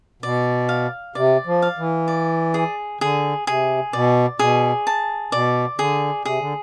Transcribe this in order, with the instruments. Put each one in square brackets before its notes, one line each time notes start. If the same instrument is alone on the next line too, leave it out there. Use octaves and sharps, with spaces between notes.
[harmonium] B2 [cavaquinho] D5
[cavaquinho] F5
[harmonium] C3 [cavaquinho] D5
[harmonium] F3
[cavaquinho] F5
[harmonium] E3
[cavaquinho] D5
G#4
[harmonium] D3 [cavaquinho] G#4
[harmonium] C3 [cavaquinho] G#4
[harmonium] B2 [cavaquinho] D5
[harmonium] B2 [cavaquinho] G#4
[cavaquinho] A5
[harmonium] B2 [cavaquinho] D5
[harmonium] D3 [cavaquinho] G#4
[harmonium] C3 [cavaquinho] G#4
[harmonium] D3